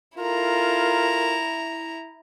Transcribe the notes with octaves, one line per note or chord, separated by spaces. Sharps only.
E4 F4 A4 A#4 A#5